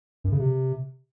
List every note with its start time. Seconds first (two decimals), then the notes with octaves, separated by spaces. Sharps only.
0.24 F#2
0.32 C#3
0.39 C3